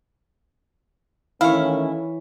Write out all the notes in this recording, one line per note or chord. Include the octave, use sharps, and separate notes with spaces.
D#3 E3 A3 C#4 E4 C#5 F5